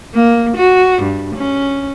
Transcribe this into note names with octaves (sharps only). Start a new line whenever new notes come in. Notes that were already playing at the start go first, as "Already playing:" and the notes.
A#3
F#4
G2
C#4